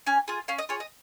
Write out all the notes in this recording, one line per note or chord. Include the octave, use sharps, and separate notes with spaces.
C#4 G#5
F4 G#4
C#4 F5
D#5
F4 G#4 C#5
D#5